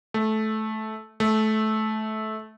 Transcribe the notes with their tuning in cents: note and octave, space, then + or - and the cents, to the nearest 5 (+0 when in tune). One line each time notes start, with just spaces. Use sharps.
A3 -15
A3 -20